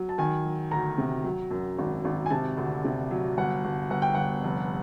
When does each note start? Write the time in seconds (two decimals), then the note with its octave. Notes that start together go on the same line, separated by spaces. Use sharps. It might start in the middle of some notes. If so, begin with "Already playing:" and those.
Already playing: F#3
0.09 A5
0.18 D#3 G#5
0.45 F#3
0.71 D2 A#5
0.98 C3
1.24 F#3
1.51 F#2
1.78 G#1
2.05 G#1
2.26 G#5
2.30 C3 A5
2.57 D2
2.84 C3
3.11 F#3
3.37 G1 F#5
3.64 G1
3.90 G1 F#5
4.02 G5
4.14 G1 F#5
4.44 F1